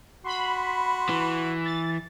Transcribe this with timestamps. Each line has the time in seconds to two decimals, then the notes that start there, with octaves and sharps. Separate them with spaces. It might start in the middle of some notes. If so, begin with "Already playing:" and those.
0.24 F#4 B5 C6
1.09 E3
1.66 A6